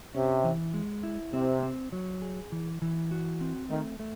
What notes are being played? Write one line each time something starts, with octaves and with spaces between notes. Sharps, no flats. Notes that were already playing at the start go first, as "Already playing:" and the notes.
C3 C#4
E3
G#3
E4
C3 C4
C4
F#3
G#4
E3
E3
F#4
C4
D#3 A3
A3